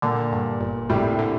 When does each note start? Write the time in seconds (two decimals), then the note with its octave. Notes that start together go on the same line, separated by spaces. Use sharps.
0.02 A#2 D3
0.32 G2
0.60 G1
0.89 A2 C3 G3
1.19 D3